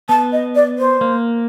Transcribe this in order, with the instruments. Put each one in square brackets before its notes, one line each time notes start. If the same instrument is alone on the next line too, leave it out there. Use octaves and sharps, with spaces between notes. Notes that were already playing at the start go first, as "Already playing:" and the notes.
[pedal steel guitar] B3 [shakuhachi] A5
[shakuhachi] D#5
D5
C5
[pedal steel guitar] A#3